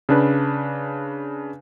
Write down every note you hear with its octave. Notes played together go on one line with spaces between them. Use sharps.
C#3 D4 B4